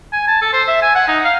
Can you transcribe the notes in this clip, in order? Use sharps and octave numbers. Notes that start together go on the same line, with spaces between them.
G#5
A5
A4
C5
E5
G#5
F#5
D#4
F5